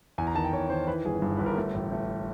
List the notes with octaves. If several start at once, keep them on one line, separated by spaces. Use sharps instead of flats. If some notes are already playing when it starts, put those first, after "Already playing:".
E2 G#5
A#5
D#3 A5
G5
E2 C#5
D#3 C5
E3 B4
G1 G#4
G2
G1 B4
A#4
A3 A4
A1
A3